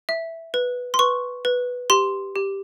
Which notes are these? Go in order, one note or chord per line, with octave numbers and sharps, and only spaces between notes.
E5
B4
C6
B4 C#6
B4
G4 C6
G4